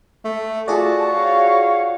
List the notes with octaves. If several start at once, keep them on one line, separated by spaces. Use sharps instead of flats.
A3
F4 F#4 G#4 D5 A5
C#5 F5